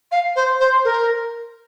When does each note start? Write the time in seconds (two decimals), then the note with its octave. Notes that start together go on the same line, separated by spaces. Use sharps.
0.11 F5
0.36 C5
0.60 C5
0.84 A#4